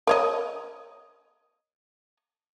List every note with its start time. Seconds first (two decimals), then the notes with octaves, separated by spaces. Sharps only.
0.07 A#4 C#5 D#5